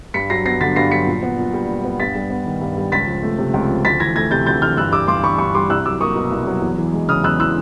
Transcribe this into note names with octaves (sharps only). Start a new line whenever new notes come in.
G2 B6 C#7
F#3 A#6 C7
B3 A#6 C7
D3 A6 B6
G2 A#6 C7
F#3 B6 C#7
A#2
B3
A#2
G3
A#2
B3
G2 A6 B6
G3
B3
D#3
G2
G3
C#2 A6 B6
F3
A3
C3
C#2
F3
D2 A6 B6
E3 G#6 A#6
A3 G#6 A#6
C3 G6 A6
D2 G6 A6
E3 F6 G6
G2 E6 F#6
G3 D6 E6
G2 C6 D6
E3 B5 C#6
G2 B5 C#6
G3 C6 D6
C2 E6 F#6
F#3 D6 E6
A#3 C#6 D#6
B2
C2
F#3
E2
E3
G#3
C#3 D#6 F6
E2 E6 F#6
E3 E6 F#6